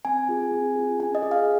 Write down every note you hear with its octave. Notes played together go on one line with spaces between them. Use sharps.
C4 G#5
F4 G#4
C4
F4 G#4
C#4 G#5
D#5
G#4
F5